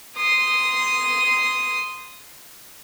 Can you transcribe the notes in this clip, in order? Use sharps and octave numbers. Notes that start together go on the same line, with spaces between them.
C6 D#6